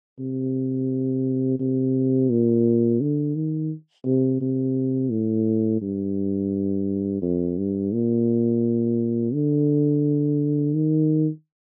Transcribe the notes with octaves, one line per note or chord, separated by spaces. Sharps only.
C3
C3
A#2
D3
D#3
C3
C3
A2
G2
F2
G2
A#2
D3
D#3